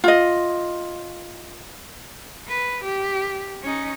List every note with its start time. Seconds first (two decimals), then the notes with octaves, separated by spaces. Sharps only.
0.04 F4 D#5
2.48 B4
2.84 G4
3.63 C#4 D#4